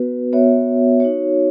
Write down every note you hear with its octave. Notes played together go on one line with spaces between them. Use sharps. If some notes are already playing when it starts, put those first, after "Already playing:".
Already playing: B3 F#4 B4
B3 F#4 C#5 E5
D#4 F#4 C#5